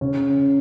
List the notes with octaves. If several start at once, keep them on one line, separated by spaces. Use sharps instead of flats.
C#3 C#4